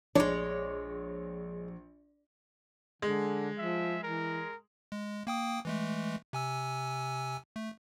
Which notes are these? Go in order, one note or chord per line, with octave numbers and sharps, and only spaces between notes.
A#1 G#3 D4 C#5 D5
D3 G#3
F3 E5
E3 A#4
G#3
A#3 G5 D#6
E3 G#3 A3
C3 G#5 E6
A3